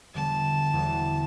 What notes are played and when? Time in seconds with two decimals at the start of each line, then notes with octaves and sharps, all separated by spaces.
0.14 E1 E2 D3 G3 B3 A5
0.73 E1 E2 D3 G3 B3